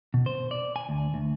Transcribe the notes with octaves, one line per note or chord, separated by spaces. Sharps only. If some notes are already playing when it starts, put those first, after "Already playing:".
B2
C5
D5
G#5
D2
D2